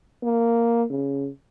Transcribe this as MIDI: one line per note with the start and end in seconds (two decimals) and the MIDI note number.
0.23 0.84 58
0.90 1.28 49